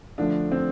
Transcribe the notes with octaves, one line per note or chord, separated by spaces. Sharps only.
D3 F3 A3 D4
C4